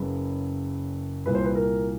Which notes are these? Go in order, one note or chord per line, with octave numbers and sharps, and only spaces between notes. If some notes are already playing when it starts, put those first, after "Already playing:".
Already playing: F#1 F#2 C#3 B4
C2 A#2 B4
C5
B4
A#4